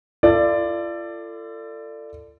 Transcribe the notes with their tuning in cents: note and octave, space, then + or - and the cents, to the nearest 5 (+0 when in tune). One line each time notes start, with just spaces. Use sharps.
F4 -40 A4 +25 D5 +10